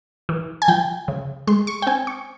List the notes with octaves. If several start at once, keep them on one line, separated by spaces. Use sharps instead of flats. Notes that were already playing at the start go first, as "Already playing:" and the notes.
E3
G#5
F3 G5
C#3
G#3 C6
C#6
G5
C4 G#5
C#6